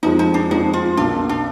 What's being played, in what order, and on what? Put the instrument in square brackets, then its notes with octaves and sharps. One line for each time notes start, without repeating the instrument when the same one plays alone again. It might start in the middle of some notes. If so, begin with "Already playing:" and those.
[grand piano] F2 F3 G#3 [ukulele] D#4
[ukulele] D#4
D4
[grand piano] F2 F3 G#3 [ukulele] D#4
[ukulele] F4
[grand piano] B1 B2 A#3 [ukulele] D4
[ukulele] D4